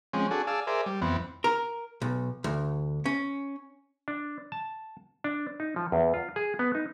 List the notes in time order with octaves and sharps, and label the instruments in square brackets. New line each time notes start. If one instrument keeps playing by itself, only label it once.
[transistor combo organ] F3 G#3 C4 C#4
D4 F#4 G#4 A4
G#4 D5 F5 A5 E6
G#4 A#4 C5 D5 E5
G3
F2 E3 B3 C4
[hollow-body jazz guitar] A#4
B1
D2
C#4
[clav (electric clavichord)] D4
A5
D4
D#4
F3
E2
F4
G#4
B3
D#4